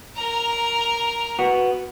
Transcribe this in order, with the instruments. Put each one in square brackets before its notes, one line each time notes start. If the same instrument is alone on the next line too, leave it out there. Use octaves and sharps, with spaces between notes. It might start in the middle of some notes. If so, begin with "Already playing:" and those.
[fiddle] A#4 A#5
[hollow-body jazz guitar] B3 F#4